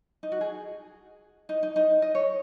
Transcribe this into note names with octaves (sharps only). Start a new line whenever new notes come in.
D#4
F#4
G#4
D#4
D#4
D#4
D#5
C#5